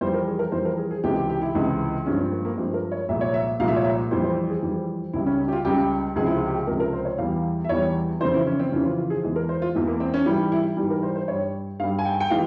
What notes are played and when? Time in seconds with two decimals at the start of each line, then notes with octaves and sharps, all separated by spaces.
0.01 F2 E3 G3 C5
0.14 A#4
0.27 G#4
0.39 A#4
0.52 F2 E3 G3 C5
0.65 A#4
0.78 G#4
0.91 G#4
1.04 C#2 C3 E3 G#3 G4
1.16 G4
1.30 G4
1.42 E4
1.55 C#2 C3 E3 G#3
2.06 G2 F3 G#3 C#4
2.19 C4
2.31 A#3
2.45 A#3
2.57 G2 F3 G#3 C4
2.74 A#4
2.92 C#5
3.09 C2 A#2 F3 G#3 E5
3.21 C#5
3.34 E5
3.59 C2 A#2 F3 G#3 F5
3.68 E5
3.76 C#5
3.85 E5
4.11 F2 E3 G3 C5
4.24 C5
4.50 G#4
4.62 F2 E3 G3
5.13 C#2 C#3 G3 E4
5.26 C#4
5.39 C#4
5.48 G4
5.52 F4
5.65 C#2 C#3 G3 G4
6.16 C#2 C3 F3 G#3 G#4
6.26 E4
6.36 F4
6.47 G4
6.57 G#4
6.67 C#2 C3 F3 G#3 A#4
6.80 A#4
6.93 C5
7.05 C#5
7.18 E2 E3 G3 F5
7.64 E5
7.69 E2 E3 G3 C#5
8.21 F2 C#3 E3 C5
8.34 E4
8.46 C#4
8.59 C4
8.72 F2 C#3 E3 C#4
8.85 F4
8.98 F4
9.10 G#4
9.24 E2 E3 G#3 G#4
9.36 A#4
9.49 C5
9.62 F4
9.75 E2 E3 G#3
9.87 A#3
10.00 C4
10.14 C#4
10.26 G#2 E3 G3 E4
10.52 E4
10.77 G#2 E3 G3 G4
10.90 A#4
11.03 C5
11.15 C5
11.28 G2 G3 C#5
11.79 G2 F5
11.83 G3
11.99 G#5
12.05 G5
12.20 G5
12.30 E3 G#3 F5